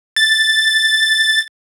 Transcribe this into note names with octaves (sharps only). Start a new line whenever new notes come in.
A6